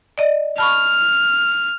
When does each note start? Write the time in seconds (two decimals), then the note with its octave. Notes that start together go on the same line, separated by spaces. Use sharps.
0.18 D5 D#5
0.58 A5 B5 C#6 F6